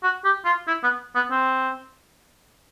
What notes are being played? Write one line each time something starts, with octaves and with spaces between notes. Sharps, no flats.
F#4
G4
F4
E4
B3
B3
C4